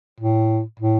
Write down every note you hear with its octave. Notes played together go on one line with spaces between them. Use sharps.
A2
A2